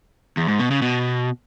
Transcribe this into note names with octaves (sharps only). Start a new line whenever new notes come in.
E2
G#2
B2
C#3
B2